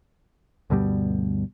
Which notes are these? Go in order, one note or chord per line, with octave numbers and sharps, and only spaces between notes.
D2 G2 B2 G3